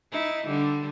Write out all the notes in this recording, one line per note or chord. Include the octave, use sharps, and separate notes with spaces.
D#4 E4
D3 G3